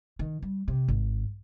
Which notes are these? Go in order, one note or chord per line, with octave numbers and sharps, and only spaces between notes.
D#3
G3
C3
G#1